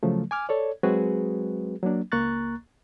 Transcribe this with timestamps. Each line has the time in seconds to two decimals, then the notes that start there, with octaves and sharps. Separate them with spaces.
0.03 C#3 F3 F#3 A3
0.31 G#5 D6 F6
0.49 A4 C#5 D5
0.83 F#3 G#3 C4 F#4 G#4 B4
1.83 F#3 A#3 D4
2.12 C#2 A#3 A#5 C#6 F#6 A6